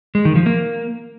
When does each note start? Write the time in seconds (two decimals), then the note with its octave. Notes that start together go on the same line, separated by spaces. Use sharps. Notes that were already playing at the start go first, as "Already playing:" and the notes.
0.15 G#3
0.25 D#3
0.36 F3
0.46 A#3